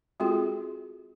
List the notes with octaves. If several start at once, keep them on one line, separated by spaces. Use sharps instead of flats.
G#3 C4 F4 F#4 G#4 A4